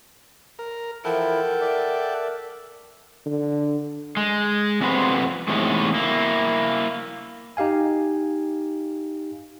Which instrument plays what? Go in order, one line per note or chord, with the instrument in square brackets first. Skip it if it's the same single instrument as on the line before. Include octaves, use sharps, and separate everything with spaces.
[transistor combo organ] A#4
[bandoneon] E3 F3 E4 [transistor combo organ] A4 F#5 G5 [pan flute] A#4
[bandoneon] D5 E5
[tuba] D3
[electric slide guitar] G#3
F2 C3 B3 C#4 B4 C5
E2 A2 C3 G#3 A3 D#4
A#3 E4
[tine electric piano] D#4 G4 F5 G#5